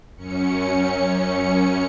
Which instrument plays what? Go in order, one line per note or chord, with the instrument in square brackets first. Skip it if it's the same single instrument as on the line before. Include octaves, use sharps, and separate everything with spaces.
[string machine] F#2 C#4 C#7